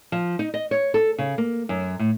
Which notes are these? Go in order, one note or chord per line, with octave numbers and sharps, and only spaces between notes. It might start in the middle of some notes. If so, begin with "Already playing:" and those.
F3
D#4
D#5
C#5
A4
C#3
A#3
F#2
A2